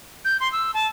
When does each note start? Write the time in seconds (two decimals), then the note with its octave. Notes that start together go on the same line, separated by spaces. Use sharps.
0.25 G6
0.40 C6
0.52 E6
0.74 A5